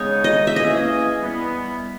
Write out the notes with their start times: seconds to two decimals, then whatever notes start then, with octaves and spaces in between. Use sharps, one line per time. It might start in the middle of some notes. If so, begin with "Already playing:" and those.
Already playing: C#3 G#3 B3 D#4 C#5
0.24 D#5
0.47 E5
0.56 E3 A#3 C#4 G#4 D#5
1.22 E3 G3 B3